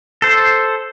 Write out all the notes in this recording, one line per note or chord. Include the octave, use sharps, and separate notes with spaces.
A4 C5